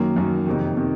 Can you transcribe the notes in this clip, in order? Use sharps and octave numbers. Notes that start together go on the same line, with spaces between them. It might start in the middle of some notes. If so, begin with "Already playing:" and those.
Already playing: F#2 D#3 A#3
F#2 D#3 A#3
F2 C3 D#3
C3 D#3